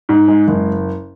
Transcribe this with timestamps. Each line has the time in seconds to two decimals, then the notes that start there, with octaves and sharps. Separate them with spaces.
0.09 G#2
0.28 G#3
0.48 F#1